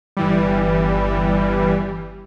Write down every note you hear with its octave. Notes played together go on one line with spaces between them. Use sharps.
G1 E3 G3